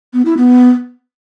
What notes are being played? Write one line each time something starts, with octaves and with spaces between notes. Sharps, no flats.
B3
E4
B3